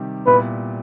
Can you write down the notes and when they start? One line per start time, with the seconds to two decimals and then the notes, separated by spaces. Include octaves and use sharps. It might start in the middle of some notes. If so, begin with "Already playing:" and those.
Already playing: C3 D#3 G3
0.26 A#2 G3 B3 E4 B4